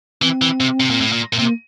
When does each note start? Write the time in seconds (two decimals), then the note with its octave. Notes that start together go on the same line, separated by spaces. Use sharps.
0.22 E3 C4
0.42 E3
0.60 C3
0.80 C3
0.90 A#2
1.01 A2
1.12 A#2
1.33 A#2
1.39 C3 A#3